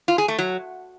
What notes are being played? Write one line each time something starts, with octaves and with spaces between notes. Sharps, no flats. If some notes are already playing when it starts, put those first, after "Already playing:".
F4
G#4
A3
F#3